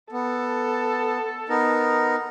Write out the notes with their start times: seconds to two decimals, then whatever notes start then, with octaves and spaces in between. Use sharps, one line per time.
0.12 B3 A4
1.49 B3 D#4 A#4